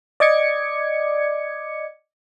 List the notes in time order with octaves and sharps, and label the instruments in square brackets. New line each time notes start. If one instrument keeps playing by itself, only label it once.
[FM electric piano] D5 D#5 D6 G#6 C#7